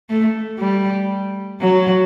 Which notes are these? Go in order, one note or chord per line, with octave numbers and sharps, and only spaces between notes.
A3
G3
F#3